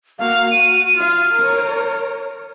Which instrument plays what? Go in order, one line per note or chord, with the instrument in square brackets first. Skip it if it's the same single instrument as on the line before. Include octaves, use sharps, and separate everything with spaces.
[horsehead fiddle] A#3 F#4 [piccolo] F5
[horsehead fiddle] F#4 [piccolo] D#7
[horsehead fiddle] F4 F5 [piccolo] F6
[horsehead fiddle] A#4 C#5